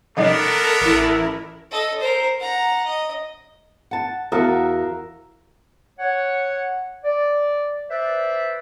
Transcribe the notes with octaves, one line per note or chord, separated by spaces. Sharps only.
C#3 G3 A3 B3 D4 D#4 A4 A#4
A1 E4
A4 D#5
A#4 C5
F#5 A#5
D#5
F#5 A5
E2 F#4 A#4 E5 F5 A5
C#5 F#5
D5
B4 C5 D5 E5